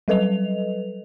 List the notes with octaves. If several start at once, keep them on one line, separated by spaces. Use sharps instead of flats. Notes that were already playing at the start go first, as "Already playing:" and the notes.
F#3 G3 A4 B4 D#5 F7